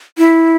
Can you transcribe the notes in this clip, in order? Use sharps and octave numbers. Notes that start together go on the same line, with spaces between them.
E4